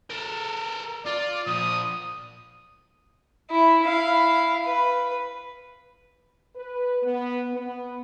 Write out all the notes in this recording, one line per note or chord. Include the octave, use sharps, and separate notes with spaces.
A4 A#4
F4 D5
A#2 F3 D#6
E4
E4 F5
B4
B4
B3
B3